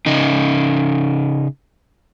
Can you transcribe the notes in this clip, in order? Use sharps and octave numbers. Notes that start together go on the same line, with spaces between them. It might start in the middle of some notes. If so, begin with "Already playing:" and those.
C#3 D#4